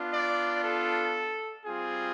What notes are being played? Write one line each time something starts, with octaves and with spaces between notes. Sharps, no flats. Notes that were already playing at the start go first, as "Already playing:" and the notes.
Already playing: B3 D4 F4
D5
A4
G3 C4 F4 G#4